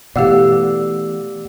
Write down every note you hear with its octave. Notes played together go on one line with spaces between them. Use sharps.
B2 E3 A3 G4 D5 F5 F#5 E6